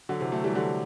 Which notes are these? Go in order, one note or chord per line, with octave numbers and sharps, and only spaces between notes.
D3 F#3
C3 E3
F#3 A3
E3 G3
D3 F#3